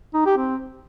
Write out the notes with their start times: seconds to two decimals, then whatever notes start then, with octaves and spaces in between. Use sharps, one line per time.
0.14 D#4
0.26 G4
0.37 C4